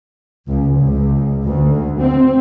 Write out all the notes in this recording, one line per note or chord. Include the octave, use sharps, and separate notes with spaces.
C#2
C#2
D2
C4